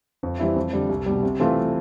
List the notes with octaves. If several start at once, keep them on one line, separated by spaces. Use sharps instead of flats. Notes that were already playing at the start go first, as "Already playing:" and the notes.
F2
E3 G3 C4 E4
F2
D3 G3
C2
B2 G3
C3
E3 A3 C4 F4